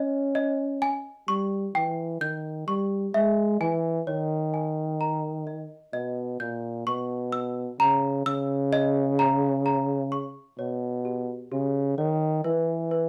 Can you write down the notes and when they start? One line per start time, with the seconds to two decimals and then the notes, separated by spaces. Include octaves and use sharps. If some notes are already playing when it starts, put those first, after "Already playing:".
Already playing: C#4 D#5
0.35 D#5
0.82 G#5
1.28 G3 C#6
1.75 E3 G5
2.21 D#3 G6
2.67 G3 C#6
3.14 G#3 E5
3.61 E3 G#5
4.07 D#3 C#5
4.54 G#5
5.01 A#5
5.47 D#5
5.93 B2 D#5
6.40 A#2 G6
6.87 B2 C#6
7.32 E6
7.80 C#3 A#5
8.26 C#3 E6
8.73 D#5
9.19 A#5
9.66 A#5
10.12 C#6
10.58 B2 C#5
11.05 G4
11.52 C#3 G4
11.98 D#3 C#5
12.44 E3 B4
12.91 B4